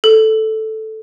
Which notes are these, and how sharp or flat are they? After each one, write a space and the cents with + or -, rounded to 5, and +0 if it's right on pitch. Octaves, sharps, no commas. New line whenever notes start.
A4 -5